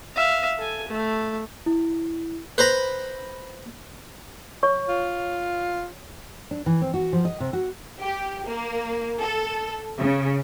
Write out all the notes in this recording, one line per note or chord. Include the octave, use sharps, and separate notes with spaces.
E5 F5
A4 G#5
A3
E4
B4 C5 A#5 B5
C#5 C#6
F4
D4
E3
C4
F#4
F3
D#5
C3
F#4
G4
A#3
A4
C#3